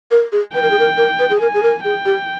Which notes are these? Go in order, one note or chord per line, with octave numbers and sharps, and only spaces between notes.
A#4
G#4
B4 G5
A#4
G#4
A#4
A#4
B4
G#4
A#4 G#5
G#4
A#4
G#4 G5
G4